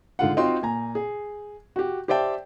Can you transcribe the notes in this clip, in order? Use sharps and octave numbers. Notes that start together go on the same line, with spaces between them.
G#2 D3 F4 F#5
C4 D#4 F4 F#4 G5 C6
A#2 G#5 A#5
G#4
F#4 G4
G4 C5 D5 E5 G5 A5